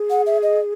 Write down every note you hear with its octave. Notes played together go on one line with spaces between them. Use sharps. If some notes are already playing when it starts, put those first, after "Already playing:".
Already playing: G#4
F#5
E5
D#5